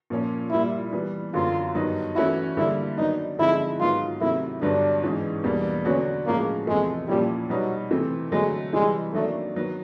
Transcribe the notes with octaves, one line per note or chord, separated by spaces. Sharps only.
A#2 F3 A#3 C#4
A#2 G3 A#3 E4
E3 G3 B3
F#2 D3 F#3 B3 F4
G2 D#3 F#3 B3 D#4
E3 A3 C#4 E4 F#4
D3 G3 A#3 E4
D#3 F#3 B3 D4 D#4
D3 F3 G#3 C4 D#4 E4
G#2 D#3 F#3 B3 F4
C3 D#3 F#3 A3 E4
G2 D3 F#3 B3 D4
G#2 E3 G#3 C#4
E2 B2 G3 A#3 D4
D3 F#3 B3 C#4 D4 F#4
A2 F3 G#3 A#3 C#4 F#4
E2 C3 F3 G#3 A3
A#2 F3 G3 A#3 C#4 E4
B2 F#3 G3 B3 D#4
C3 E3 A3 C4
D3 F#3 G#3 A3
C3 E3 G3 G#3 C4
D#3 F#3 A3 A#3 D4
D#3 F#3 B3